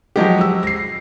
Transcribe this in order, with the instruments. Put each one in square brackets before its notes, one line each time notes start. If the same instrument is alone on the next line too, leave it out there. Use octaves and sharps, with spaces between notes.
[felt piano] F3 F#3 G#3 G4
E6
A#6 C7